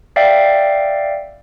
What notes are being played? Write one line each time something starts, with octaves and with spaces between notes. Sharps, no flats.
D5 E5 F5 G5